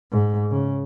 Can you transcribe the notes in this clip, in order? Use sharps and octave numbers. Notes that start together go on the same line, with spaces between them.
G#2
C#3